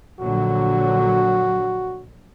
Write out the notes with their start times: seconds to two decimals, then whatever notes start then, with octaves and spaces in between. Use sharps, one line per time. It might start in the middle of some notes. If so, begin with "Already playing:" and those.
0.20 A#1 D3 F#3 F#4